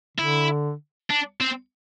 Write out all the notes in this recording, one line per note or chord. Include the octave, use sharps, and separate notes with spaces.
D3 E4
D4
C4